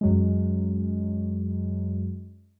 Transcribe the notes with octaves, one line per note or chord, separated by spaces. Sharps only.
F#2 F#3 G#3